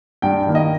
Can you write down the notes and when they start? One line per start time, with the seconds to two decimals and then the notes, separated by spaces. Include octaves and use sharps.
0.22 G2 G5
0.47 D#3 A#3
0.55 D#5